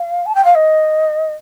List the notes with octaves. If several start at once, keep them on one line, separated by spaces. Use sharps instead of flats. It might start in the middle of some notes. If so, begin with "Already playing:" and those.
Already playing: F5
A5
G5
F5
D#5